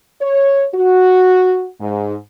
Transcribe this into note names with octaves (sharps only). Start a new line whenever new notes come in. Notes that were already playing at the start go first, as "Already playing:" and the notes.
C#5
F#4
G#2